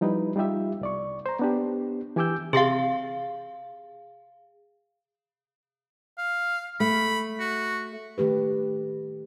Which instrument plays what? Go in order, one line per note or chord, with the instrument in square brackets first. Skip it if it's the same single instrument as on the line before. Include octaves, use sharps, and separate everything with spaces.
[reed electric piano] F3 G3 D#4 E4 B4
G3 D#4 F4 G4 E5
C2 D5 C#6
C5 A#5
B3 D4 G4
E3 G4 G#5 D6 E6 G6
[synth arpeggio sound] C3 C6 A6 [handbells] G#4 F5
[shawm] F5
[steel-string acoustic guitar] A3 [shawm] B5
[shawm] F#4
[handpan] D#3 A3 G4 B4